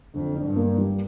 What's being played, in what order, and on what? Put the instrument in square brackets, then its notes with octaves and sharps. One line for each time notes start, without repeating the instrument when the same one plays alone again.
[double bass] F2 [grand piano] D3
[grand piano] D4
[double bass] G2
[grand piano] A#3
G3